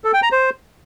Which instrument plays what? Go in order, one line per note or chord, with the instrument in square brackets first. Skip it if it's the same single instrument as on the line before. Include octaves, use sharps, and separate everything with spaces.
[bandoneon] A4
G5
A#5
C5